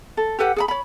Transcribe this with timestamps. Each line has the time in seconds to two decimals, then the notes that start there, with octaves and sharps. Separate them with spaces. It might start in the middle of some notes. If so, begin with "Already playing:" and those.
0.17 A4
0.39 G4 A4 B4 F#5
0.56 G#4 F#5 B5
0.68 C#5 B5